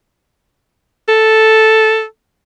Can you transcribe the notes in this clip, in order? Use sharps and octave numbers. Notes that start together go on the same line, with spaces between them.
A4